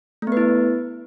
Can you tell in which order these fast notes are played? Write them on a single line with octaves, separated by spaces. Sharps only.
A3 B3 B4 E4